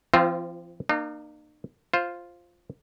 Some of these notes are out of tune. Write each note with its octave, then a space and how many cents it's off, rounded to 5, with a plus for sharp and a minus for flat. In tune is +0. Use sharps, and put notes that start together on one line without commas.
F3 -35 C4 -5 F4 +0
A#3 +0 D#4 -45
F4 +0 C5 +10